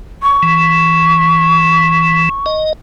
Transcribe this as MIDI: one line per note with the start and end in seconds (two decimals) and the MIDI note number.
0.23 2.50 85
0.43 2.29 52
2.46 2.73 75